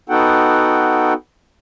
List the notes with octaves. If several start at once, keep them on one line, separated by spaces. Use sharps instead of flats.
B3 D#4 F#4 A4 F#5 G5